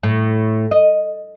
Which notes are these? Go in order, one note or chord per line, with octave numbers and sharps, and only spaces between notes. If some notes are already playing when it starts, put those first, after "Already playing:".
A2
D#5